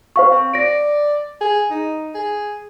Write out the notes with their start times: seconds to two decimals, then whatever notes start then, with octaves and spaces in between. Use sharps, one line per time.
0.16 C5 F5 C#6
0.32 C4
0.54 D5 A#6 D7
1.41 G#4
1.71 D#4
2.15 G#4